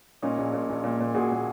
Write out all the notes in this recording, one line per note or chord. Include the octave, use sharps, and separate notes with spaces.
A#2 C#4 D#4
A#1
A#2
A#1
A#2
A#2
A#2 F#4 G#4
A#2